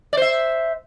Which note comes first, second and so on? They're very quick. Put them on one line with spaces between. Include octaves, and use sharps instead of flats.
D5 C5 E5